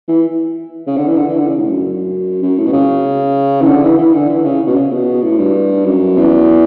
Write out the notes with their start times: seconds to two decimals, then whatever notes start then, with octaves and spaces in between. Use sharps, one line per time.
0.08 E3
0.87 C#3
0.97 D3
1.07 E3
1.17 D3
1.28 E3
1.38 D3
1.48 C#3
1.60 A2
1.70 F#2
2.42 F#2
2.58 A2
2.66 B2
2.73 C#3
3.62 E3
3.66 D3
3.83 E3
3.98 E3
4.13 D3
4.29 E3
4.44 C#3
4.67 B2
4.76 C#3
4.92 B2
5.22 A2
5.38 G2
5.85 F#2
6.17 E2